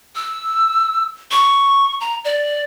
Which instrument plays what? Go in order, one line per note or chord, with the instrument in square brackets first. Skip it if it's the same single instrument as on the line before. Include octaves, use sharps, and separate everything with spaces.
[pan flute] E6
C#6
A#5
D5